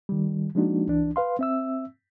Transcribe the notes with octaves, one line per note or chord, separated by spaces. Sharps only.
D#3 G3
F3 G#3 A#3 D4 D#4 F#4
C2 E3 D4
B4 F5 C6
C4 E5 E6